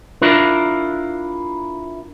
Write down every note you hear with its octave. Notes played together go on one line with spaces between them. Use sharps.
D4 E4 F4 A#4